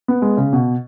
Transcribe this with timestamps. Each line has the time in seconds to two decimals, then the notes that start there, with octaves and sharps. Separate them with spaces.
0.08 B3
0.22 G#3
0.37 C#3
0.53 B2